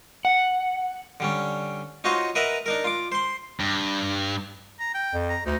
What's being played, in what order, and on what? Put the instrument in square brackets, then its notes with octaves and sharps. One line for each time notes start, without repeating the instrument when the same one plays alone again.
[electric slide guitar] F#5
[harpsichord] D3 G3 C#4
D#4 F4 F#4 C5 C#5 D#5
A#4 B4 D#5 E5 F#5 A#5
D4 D#4 A#4
F4 D6
C5 C6
[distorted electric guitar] G2
[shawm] A#5
G5
[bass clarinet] F2
[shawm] A#5
[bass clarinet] D2 [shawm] D#4